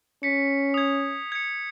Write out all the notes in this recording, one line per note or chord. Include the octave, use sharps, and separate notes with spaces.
C#4 B6 C#7
D#6 G#6
G#6 C#7